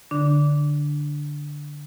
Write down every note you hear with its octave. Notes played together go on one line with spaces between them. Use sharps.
D3 D4